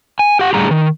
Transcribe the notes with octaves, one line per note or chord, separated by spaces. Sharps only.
G#5
G4 F#5
A2 D3 G3 G#4 A#5
D#3